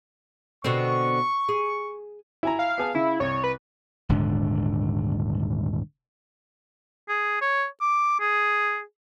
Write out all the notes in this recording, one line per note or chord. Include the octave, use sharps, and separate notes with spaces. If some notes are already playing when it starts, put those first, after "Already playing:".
B2 D3 C4 C#6
G#4
E4 G#5 A#5
F5
B3 G#4 A5
C#3 E4
C2 C#5
B4
D#1 G#2 D3 D4
G#4
C#5
D6
G#4